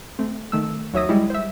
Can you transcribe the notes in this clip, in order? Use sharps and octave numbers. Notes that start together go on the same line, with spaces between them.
A3 C4
D#3 A3 E6
D#2 F#3 C#5 E5 D#6 A#6
G3 G#3 E4
C5 E5